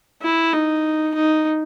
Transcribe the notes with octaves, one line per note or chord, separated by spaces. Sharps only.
E4
D#4
D#4